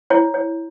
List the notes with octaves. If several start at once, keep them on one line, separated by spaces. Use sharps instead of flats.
E4 C#5
C#5